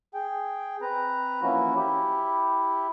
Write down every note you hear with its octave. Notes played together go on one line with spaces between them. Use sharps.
G#4 G5
C4 B4 A#5
E3 F3 A#3 C#4 E4 F#4
E4 G4